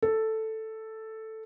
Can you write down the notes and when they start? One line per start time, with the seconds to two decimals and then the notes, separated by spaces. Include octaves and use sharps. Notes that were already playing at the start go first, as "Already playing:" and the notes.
0.03 A4